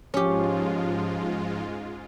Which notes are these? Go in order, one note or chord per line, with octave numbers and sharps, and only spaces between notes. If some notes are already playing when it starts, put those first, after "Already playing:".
G#2 F3 G#3 C#4 F4 G4